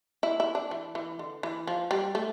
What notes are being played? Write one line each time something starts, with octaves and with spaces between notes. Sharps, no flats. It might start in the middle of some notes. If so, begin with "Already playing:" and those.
E4
E4
D4
E3
E3
D3
E3
F3
G3
A3